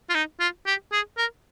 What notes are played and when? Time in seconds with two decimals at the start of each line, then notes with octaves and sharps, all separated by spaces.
0.09 F4
0.15 D#4
0.40 F4
0.66 G4
0.92 G#4
1.17 A#4